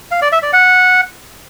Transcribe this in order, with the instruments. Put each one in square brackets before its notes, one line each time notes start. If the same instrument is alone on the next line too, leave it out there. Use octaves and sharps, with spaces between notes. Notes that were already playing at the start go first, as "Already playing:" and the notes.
[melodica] F5
D5
E5
D5
F#5